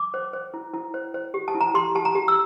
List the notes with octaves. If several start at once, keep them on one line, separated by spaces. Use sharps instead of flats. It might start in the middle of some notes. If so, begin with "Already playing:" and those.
Already playing: D6
C5
C5
E4
E4
C5
C5
G4
A5
E4
A#5
G4 C6
G4 A5
A#5
G4
E6